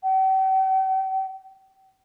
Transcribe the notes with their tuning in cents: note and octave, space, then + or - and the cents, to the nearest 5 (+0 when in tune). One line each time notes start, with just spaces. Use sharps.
G5 -45